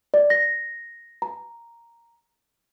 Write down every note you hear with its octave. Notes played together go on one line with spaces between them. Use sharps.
D5
A#6
A#5